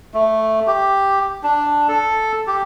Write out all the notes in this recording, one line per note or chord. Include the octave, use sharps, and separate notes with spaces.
A3
G4
D4
A4
G4